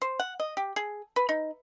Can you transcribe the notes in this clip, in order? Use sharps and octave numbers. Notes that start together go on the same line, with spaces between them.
C5
F#5
D#5
G4
G#4
B4
D#4